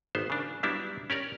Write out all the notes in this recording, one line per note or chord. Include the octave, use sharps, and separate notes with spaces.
G#1 B3 C5
C#3 D4
F#3 G3 B3 D4 E4
C#4 G4 A#4 D5